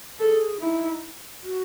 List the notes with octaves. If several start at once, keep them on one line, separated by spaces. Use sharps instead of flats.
G#4 A4 A#4
D#4 E4
F#4